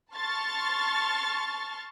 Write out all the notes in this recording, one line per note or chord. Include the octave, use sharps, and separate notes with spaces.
A5 C6 C#6 F6 A6